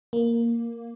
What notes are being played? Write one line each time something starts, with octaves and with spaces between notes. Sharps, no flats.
A#3